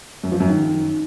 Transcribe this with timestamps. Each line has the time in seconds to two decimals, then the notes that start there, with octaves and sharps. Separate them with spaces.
0.24 F#2
0.32 F3
0.40 F#2
0.49 D#3